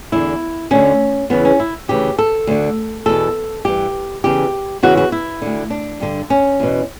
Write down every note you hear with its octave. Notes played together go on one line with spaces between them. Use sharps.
E2 D3 E4
D2 D3 C#4
E2 C#3 E3 B3
C#4
E4
D2 C#3 E3 G4
A4
D2 D3
E2 B2 A4
G2 E3 G4
E2 C#3 E3 G4
E2 C#3 E3 F#4
F#4
E4
D2 D3
D4
G2 D3
C#4
E2 B2